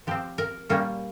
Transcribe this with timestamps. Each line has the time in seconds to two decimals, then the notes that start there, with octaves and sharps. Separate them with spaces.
0.07 F3 C4 G4
0.38 A#4
0.69 A#2 G3 A#3 C#4